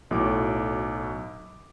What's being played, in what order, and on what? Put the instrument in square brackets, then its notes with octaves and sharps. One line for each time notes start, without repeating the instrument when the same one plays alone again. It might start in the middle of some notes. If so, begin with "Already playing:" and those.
[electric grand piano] B1 A2 F#3 D6